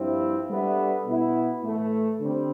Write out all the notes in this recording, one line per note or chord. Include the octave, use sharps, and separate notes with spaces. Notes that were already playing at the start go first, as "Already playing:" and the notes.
Already playing: G2 F3 C4 E4
G3 B3 D4 A4 E5
B2 B3 E4
A2 E3 A3
D3 G3 C4